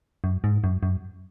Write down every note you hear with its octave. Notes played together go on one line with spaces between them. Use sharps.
F#2
G#2
F#2
F#2